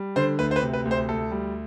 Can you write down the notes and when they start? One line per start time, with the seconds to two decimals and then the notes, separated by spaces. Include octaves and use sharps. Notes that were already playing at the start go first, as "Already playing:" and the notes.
Already playing: G3
0.16 D3 C5
0.39 D2 B4
0.51 C5
0.56 B4
0.61 C3
0.73 B4
0.85 D2
0.91 C5
1.09 D2 A4
1.31 G3